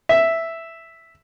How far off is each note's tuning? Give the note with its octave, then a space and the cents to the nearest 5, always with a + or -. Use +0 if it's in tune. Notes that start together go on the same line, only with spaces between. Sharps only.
E5 +0